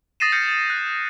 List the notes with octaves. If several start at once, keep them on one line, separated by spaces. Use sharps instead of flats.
D#6 A6 A#6 C7 D#7 E7
F6 G6 A#6 C7 C#7
A6
F#6